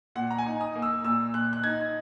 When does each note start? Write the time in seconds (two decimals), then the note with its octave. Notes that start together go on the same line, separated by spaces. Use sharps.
0.15 A#2 F#5
0.31 A#5
0.38 G#5
0.46 D#4
0.61 D#6
0.75 A#3
0.82 E6
1.04 A#2 E6
1.34 A#2 F#6
1.53 F#6
1.64 D#4 G#6